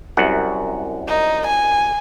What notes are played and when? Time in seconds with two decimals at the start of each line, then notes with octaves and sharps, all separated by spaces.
0.17 C2 F#2 F#5
1.08 D#4
1.47 G#5